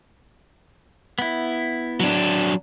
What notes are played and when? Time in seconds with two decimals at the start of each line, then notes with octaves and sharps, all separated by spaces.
1.19 B3 E4
2.00 F#3 D4